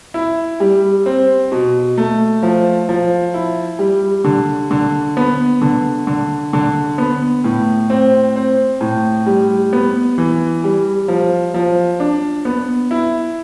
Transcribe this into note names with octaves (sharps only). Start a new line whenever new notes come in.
E4
G3
C4
B2
A3
F3
F3
E4
G3
D3
D3
B3
D3
D3
D3
B3
A2
C4
C4
A2
G3
B3
E3
G3
F3
F3
D4
B3
E4